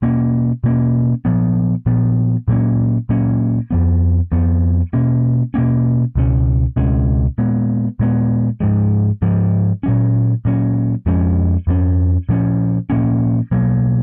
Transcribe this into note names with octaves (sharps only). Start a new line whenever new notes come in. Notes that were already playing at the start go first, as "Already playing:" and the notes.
B2 A#3 C#4
B2 A#3 C#4
A#2 F3 B3
A#2 F3 B3
A#2 F#3 A#3 C#4
A#2 F#3 A#3 C#4
F2 F3 B3
F2 F3 B3
B2 A#3 C#4
B2 A#3 C#4
C#2 B2 G#3 C#4
C#2 B2 G#3 C#4
A#2 G#3 B3
A#2 G#3 B3
G#2 F3 G#3
G#2 F3 G#3
A#2 F#3 C#4
A#2 F#3 C#4
F2 F3 G#3 C#4
F2 F3 G#3 C#4
A#2 F3 A#3 C#4
A#2 F3 A#3 C#4
B2 F#3 A#3